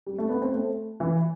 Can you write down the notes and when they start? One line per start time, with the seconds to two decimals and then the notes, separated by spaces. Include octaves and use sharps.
0.07 G3
0.18 A3
0.29 B3
0.42 C4
0.53 A3
1.00 E3